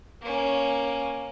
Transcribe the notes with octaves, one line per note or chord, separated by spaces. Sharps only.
A#3 C#4